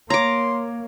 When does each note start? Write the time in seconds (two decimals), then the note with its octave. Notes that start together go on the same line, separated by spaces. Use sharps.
0.10 A#3 C#5 A#5 C6 D6